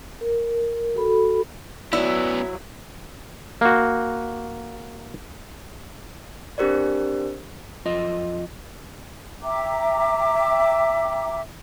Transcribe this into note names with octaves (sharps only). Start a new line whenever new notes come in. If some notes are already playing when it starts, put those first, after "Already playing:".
A#4
F#4 A4 B5
F#3 B3 C#4 E4 D5 E6
A#3 F#4
C4 D4 G4 A#4 C5 D5
F2 F4 D#5
E5 G5 A#5 D6